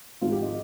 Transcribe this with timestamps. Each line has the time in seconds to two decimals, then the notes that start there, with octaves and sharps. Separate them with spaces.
0.21 G#1 G#2 F3 F4
0.32 G4
0.42 D#5